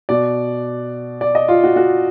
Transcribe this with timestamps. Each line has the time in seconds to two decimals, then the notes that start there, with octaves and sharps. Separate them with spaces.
0.09 B2 D5
1.21 D5
1.35 D#5
1.48 F4
1.64 F#4
1.76 F#4